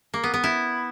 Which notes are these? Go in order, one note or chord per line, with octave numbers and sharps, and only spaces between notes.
A#3
B3
B3
E4